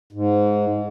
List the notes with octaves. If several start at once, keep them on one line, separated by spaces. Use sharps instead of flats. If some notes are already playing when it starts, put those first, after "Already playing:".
G#2